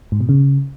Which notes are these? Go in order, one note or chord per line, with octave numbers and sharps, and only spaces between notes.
G#2
B2
C#3